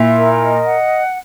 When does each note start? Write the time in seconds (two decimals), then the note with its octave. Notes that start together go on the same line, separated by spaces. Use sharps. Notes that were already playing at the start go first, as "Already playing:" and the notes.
Already playing: A#2 E4 E5
0.16 A#4
0.42 D#5
0.66 F#5